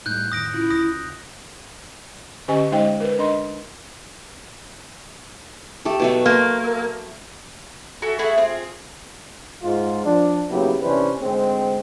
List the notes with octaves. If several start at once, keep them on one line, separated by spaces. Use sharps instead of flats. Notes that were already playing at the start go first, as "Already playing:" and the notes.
A2 G3 A3 D#4 F#6 G6
F2 D#3 D#6 A#6 D7
C#3 C#4 E4 F4
D2 D#6 A#6
D3 C#4 G4 D#5 G#5 C#6
G#3 D#4 C5 D#5 G5
A#4 B4
D4 D#5 C6
A3 G4 A4
B2 F#3 A3
A#3 C6
F#4 A4 E5 G#5
A3 E4 F#4 G#4
C4 F4 G#4
G#2 F4
F3 D4
C#3 F#3 A#3 B3 E4 G4
C3 E3 C#4 D4 B4 C5
D2 G#2 G#3 C4